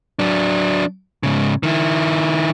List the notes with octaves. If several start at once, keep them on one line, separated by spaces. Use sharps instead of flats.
F#3 D4
G#2 C#3
D#3 E4